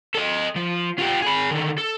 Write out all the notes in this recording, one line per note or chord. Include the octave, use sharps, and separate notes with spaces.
A4 D#5
F3
F4 G4
G#4 B5
D3 D#3
A4